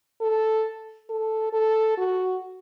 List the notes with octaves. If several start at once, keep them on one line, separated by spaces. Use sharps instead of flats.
A4
A4
A4
F#4